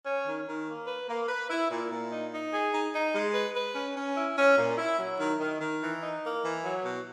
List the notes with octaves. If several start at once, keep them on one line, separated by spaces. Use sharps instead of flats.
C#4
D#3
D#3
A#3
B4
A#3
B4
E4
A#2
A#2
D#4
D#4
G#4
D#4
D#4
G#3
B4
B4
C#4
C#4
E4
C#4
A#2
E4
F#3
D#3
D#3
D#3
E3
D#4
A#3
E3
F#3
B2